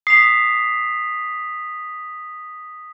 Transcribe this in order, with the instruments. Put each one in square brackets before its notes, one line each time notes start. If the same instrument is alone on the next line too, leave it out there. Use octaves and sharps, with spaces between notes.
[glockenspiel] D#6 B6 F7 [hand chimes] C7